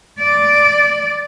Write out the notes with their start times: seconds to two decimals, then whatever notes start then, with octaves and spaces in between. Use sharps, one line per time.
0.20 D5